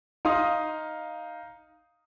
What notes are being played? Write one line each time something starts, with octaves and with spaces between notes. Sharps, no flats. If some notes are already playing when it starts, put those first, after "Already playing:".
D#4 F5 C6 D#6